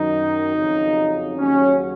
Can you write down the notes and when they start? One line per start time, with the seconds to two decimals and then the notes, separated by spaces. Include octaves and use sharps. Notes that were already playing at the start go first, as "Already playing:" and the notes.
Already playing: F#2 D#3 F#3 D#4
0.55 F2 C#3 F#3
1.37 D#2 C#3 F#3 C#4